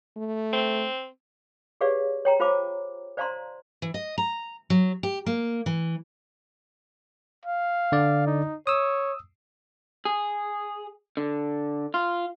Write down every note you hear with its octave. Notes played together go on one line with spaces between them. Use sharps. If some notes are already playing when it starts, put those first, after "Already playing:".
A3
C4
G4 G#4 B4 C#5 D5 F5
C#5 G5 A#5
F4 C5 F5 A5 D6
C5 D5 F5 A5 A#5 C6
E3
D#5
A#5
F#3
G4
A#3
E3
F5
D3 D5
D#4
C#5 D#6 E6
G#4
D3
F4